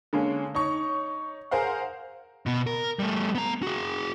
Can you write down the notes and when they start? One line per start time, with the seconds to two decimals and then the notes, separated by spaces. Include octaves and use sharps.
0.13 D3 G#3 A#3 C#4
0.55 D#4 C#5 C#6
1.51 G#4 A#4 C5 F5 F#5
2.46 B2 B3
2.67 A#4
2.99 G3 A3
3.35 B3 A#5
3.63 F#4 G#4